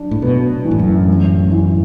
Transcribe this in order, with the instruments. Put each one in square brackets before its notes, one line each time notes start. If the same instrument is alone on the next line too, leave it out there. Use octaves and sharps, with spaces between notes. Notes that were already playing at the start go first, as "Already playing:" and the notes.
Already playing: [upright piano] F#2 D4
[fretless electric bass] A2
[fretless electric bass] B2 [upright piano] B4
[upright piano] E3
[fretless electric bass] A2
F#2
[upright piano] A1
E3